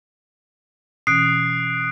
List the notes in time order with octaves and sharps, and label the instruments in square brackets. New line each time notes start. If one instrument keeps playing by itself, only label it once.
[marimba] B2 E3 C#4 [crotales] D#6 F#6 D7 [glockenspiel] C7